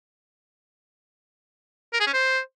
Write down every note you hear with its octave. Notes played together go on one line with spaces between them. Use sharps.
A#4
G#4
C#4
C5